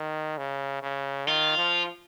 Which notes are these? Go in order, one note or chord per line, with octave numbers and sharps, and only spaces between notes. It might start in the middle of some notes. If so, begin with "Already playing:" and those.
Already playing: D#3
C#3
C#3
D#3 F4
F3